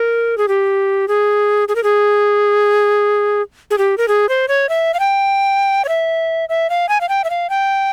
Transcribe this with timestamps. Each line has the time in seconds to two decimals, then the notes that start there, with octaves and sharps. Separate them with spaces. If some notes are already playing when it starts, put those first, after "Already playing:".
Already playing: A#4
0.38 G#4
0.48 G4
1.08 G#4
1.68 G#4
1.75 A#4
1.83 G#4
3.71 G#4
3.78 G4
3.98 A#4
4.08 G#4
4.29 C5
4.48 C#5
4.69 E5
4.94 F5
5.00 G5
5.85 C#5
5.89 E5
6.49 E5
6.70 F5
6.89 G#5
7.01 F5
7.09 G5
7.24 E5
7.30 F5
7.50 G5